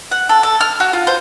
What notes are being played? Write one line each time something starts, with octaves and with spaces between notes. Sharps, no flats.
F#5
A4
A4
F6
F#4
F4
C5